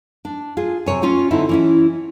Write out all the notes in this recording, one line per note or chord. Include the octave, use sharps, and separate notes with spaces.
D4
F4 G#4
C3 C#5 G#5
C#4 F4 C#5 G#5
D3 C4 D#4 E4
E3 C#4 E4